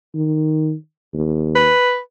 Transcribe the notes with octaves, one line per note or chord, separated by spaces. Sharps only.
D#3
D#2
B4